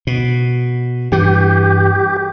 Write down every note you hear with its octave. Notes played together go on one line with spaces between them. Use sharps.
B2
G2 E3 G4